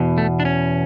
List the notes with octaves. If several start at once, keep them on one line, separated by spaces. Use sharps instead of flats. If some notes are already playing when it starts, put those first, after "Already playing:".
Already playing: E2 B2
A3
D4
C#4